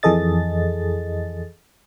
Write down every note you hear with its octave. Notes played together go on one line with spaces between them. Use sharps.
F2 E3 G#4 A4 D#5 A6